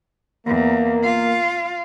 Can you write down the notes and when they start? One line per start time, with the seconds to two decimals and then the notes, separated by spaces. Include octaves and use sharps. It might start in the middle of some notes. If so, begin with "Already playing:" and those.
0.47 E2 A#3
1.04 F4 F5